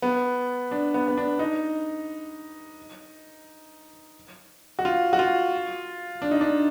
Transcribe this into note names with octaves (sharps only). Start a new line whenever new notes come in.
B3
D4
B3
B3
D4
D#4
F#4
F4
F#4
F4
D4
D#4
D4